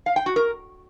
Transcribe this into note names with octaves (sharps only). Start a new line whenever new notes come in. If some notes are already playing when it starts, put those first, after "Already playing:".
F5
G5
F#4
A#4